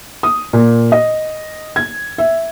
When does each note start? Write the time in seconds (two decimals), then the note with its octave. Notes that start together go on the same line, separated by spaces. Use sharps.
0.23 D#6
0.53 A#2
0.92 D#5
1.76 G#6
2.18 E5